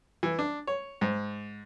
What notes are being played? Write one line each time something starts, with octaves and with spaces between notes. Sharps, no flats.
E3
D4
C#5
G#2